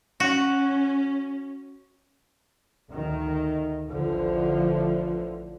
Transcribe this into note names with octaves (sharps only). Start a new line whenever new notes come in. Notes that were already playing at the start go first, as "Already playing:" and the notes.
C#4 F#4
D2 D#3
A1 D3 E3 F3